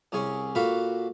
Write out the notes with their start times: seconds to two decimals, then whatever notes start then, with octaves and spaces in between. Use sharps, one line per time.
0.12 C2 C#4 G#4 G#5 C#6
0.55 A#2 F#4 A4 F5 B5 C#6